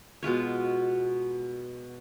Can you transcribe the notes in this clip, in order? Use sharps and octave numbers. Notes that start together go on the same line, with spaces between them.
B2 G#3 F4 C#5